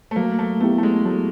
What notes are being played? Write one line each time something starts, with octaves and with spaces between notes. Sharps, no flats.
A3
F#3 A#3
A3
A3 B3 E4 G4
A3
G#3
F#3 A3